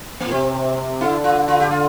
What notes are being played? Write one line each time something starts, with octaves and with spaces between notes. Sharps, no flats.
A#2 A#3
C3 C4
D3 E4
F4
F4
G4
F4